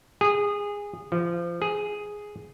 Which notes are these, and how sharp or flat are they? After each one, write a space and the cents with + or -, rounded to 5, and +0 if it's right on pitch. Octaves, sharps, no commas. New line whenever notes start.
G#4 -20
F3 -25
G#4 +0